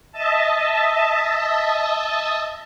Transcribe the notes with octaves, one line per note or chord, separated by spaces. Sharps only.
D#5 E5 A5